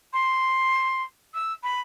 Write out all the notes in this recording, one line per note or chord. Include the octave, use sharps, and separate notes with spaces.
C6
E6
B5